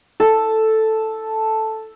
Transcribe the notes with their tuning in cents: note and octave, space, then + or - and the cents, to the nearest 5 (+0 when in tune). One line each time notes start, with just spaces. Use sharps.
A4 +0